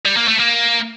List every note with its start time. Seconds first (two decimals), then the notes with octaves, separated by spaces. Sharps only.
0.05 G3
0.16 A#3
0.28 A3
0.39 A#3